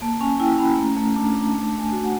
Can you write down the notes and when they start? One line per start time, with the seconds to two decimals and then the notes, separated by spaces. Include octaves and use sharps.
0.02 A#3 A5
0.21 C#4 G#5
0.40 E4 G5
0.58 C#4 B5
0.77 A3 A#5
0.97 A3
1.16 D4 A5
1.35 D4
1.54 A3 A5
1.73 A3
1.79 G#5
1.92 F#4
2.04 F#5